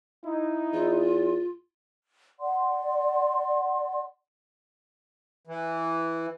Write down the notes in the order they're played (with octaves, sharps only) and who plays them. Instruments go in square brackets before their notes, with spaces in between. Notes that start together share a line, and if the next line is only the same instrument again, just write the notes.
[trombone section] D#4 E4
[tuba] E2 [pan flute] F4
[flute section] D5 F#5 C6
[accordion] E3